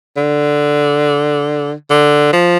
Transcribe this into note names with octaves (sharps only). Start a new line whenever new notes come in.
D3
D3
F3